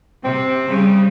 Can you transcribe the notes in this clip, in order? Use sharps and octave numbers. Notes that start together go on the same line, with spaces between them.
C3 C4
C#3 G3